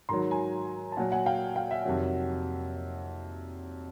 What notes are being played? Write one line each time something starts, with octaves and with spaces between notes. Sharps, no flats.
G#2 D#3 F#3 A#5 C6
G#5 A#5
A5
A#2 F#3 F#5 G#5
F#5 G#5
F5 G5
F5 G5
E5 F#5
F2 C3 D#3 F#3